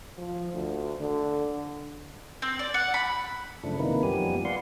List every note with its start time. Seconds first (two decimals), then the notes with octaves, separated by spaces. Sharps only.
0.18 F3
0.53 D2
1.00 D3
2.42 C4
2.59 D5
2.74 F#5
2.94 B5
3.64 F#2 C#3 F3 A3 D4
3.79 C3 D#3 A#3 D#4 E4 B4
4.03 F#2 F3 G3 B3 G4 G#5
4.45 B4 D5 F5 F#5 C6